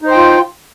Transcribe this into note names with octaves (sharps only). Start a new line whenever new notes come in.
D#4 F4 C5 G5